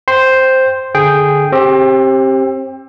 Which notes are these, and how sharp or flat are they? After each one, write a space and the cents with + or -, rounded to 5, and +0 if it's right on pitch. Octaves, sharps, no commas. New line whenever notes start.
C5 +0 G5 +0 C6 +0
D3 +5 G#4 -5 G5 +0
C4 +30 G4 +0